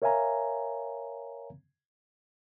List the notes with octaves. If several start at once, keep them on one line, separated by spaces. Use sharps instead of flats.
A#4 C#5 E5 F5 G#5 A#5